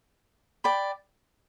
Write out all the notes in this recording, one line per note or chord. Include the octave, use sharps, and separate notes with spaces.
D5 G5 B5